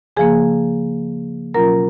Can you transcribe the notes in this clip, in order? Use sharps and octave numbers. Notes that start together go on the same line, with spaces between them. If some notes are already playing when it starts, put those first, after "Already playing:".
C#3 F3 A#3 G#4 G#5
B2 F#3 C#4 F4 A#4 A#5